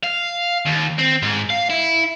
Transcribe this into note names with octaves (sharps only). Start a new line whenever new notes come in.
F5
D#2
C4
G#2
F5
E4